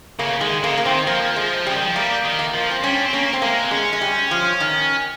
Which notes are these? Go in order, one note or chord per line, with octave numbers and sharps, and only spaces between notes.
C#3 A#3
D#3 G#3
C#3 A#3
A#3
D#3 C4
F3 A#3
G#3
C#3 G3
D#3
F3
G3 A#3
D#3
A#3
F3
C4
G3 C#4
C4
A#3 C#4
C4
G#3 A#3
C4
G#3 C#4
G#3
G3
F3
D#3